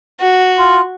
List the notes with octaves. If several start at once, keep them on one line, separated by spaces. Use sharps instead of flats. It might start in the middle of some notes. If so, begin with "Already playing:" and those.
F#4
F4